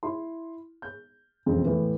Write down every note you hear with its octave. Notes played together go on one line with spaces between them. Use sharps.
E4 C6
G6
E1 F2 C#3 F3 C4
A2 E3